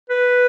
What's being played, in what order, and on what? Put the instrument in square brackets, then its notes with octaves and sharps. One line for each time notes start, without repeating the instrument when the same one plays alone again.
[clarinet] B4